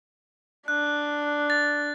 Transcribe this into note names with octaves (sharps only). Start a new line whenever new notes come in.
D4 F#6
A6